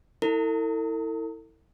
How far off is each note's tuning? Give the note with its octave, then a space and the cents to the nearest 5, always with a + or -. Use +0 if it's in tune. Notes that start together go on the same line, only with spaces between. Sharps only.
E4 -20 A4 +40